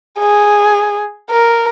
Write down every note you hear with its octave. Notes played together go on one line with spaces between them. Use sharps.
G#4
A#4